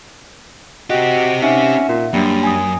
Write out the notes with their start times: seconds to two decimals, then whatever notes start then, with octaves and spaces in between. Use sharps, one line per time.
0.90 C4 F#4 G4 D#5
1.42 C#4 D#4 E5 F#5
1.88 A#2
2.14 F#2 G3 A#3 D4
2.43 G#5 D#6